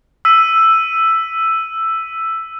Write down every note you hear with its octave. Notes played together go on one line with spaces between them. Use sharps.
E6 B6 D#7